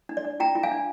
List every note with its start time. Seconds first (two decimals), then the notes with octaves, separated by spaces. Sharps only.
0.09 D4
0.17 D5
0.24 D4
0.40 F4 G5 A#5
0.55 F4
0.63 F5 G#5
0.71 D4